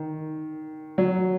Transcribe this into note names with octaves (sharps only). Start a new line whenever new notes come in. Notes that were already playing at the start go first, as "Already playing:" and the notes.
Already playing: D#3
F#3